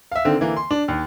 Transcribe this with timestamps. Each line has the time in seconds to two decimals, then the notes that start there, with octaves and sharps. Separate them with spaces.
0.12 E5 F5
0.25 D3 D#3 C4
0.40 D3 E3 A#3
0.57 C6
0.71 D4
0.88 D#2